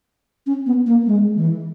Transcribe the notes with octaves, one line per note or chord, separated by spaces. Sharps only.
C#4
B3
A#3
G#3
E3